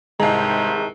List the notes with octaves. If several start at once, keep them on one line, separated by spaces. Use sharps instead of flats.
C2 G#2 C3 D#3 E3 G#3 A5 A#5